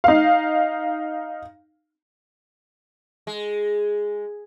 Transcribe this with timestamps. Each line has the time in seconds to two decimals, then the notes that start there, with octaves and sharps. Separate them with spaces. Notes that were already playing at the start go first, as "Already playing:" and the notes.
0.04 D#4 F5
3.27 G#3